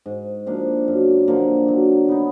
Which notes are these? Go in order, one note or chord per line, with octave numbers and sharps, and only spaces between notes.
G#2
F3 A#3 D4
F#2
D3 F3 A#3
F#3
B3 D#4